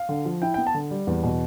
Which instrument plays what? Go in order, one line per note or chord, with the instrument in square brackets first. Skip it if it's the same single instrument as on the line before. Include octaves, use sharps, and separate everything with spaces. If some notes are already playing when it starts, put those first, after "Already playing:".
Already playing: [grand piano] F5
D3
F3
E4 G5
G5
B3
A5
D3
G3
E2
B2